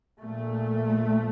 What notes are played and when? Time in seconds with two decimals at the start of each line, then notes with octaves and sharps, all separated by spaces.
0.21 A#1 A#2 A3